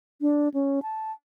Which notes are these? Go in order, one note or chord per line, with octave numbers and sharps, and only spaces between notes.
D4
C#4
A5